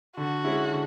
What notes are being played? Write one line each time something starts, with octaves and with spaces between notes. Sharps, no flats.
D3 F#4
G#3 C#4 E4
D3